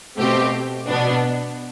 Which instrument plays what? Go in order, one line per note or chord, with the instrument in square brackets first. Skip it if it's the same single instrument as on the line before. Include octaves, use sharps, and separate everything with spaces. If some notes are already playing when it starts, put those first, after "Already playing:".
[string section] B2 A3 C4 G4 C5
B2 B3 D4